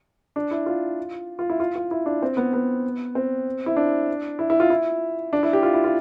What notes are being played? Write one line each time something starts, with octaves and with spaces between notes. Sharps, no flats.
D4
E4
F4
F4
E4
F4
F4
E4
D4
C4
B3
B3
C4
E4
D4
E4
E4
F4
E4
D4
E4
G4
F4
E4
F4